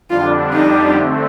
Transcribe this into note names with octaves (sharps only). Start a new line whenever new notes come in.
F2 D3 G3 D4 F4
F2 D3 G3 D4 D#4 G4
D3 A3 C4